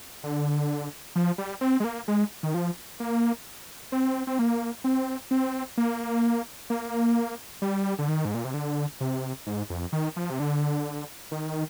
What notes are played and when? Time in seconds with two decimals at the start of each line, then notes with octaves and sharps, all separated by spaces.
0.23 D3
1.16 F3
1.38 G3
1.61 C4
1.80 G#3
1.84 A#3
2.08 G#3
2.43 D#3
2.54 F3
3.00 A#3
3.92 C4
4.27 C4
4.39 A#3
4.84 C4
5.31 C4
5.77 A#3
6.70 A#3
7.62 G3
7.99 D3
8.08 D#3
8.25 G#2
8.34 A#2
8.45 C3
8.54 D3
9.00 C3
9.47 G#2
9.70 F2
9.92 D#3
10.16 F3
10.30 C3
10.40 D3
11.31 D#3